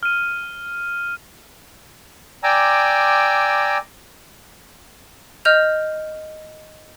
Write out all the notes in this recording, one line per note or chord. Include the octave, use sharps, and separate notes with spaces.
F6 D#7
D5 G5 G#5 A#5 D6 E6
D#5 F6 G6 F7